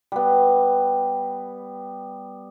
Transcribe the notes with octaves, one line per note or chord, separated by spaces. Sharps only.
G3 B3